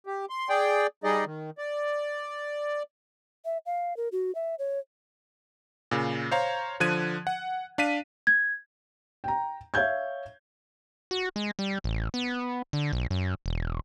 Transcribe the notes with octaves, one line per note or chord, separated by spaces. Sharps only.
G4
C6
G#4 D5 G5
G3 D#4 G#4 D5 D#5
D#3
D5
E5
F5
A#4
F#4
E5
C#5
A#2 C#3
C5 C#5 F5 A#5
D3 F3 F#6 G#6 D#7
F#5
D4 F5 B6 D#7
G#6
G5 A#5
C#5 E5 F5 G6 G#6
F#4
G#3
G3
A1
B3
D3
B1
F#2
E1